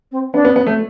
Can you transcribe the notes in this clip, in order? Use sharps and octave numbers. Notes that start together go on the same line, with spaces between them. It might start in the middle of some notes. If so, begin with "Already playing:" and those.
C4
B3 D4
B3
B3
A3